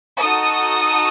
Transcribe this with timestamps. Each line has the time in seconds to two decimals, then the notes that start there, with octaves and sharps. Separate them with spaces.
0.20 D#4 F#4 A4 D#6